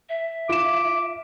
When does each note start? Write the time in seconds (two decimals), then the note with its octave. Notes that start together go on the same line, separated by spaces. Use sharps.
0.09 E5
0.49 F4 D6 E7